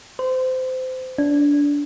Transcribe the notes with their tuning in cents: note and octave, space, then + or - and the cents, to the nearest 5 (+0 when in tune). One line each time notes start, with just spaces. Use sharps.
C5 -25
D4 -20